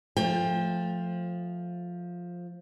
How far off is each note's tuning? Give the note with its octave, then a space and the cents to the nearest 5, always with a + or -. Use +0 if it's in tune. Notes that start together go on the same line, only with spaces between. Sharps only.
F3 +10 A3 +0 G5 +30